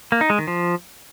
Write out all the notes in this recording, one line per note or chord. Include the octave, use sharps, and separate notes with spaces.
A#3
D#4
G#3
D#3
F3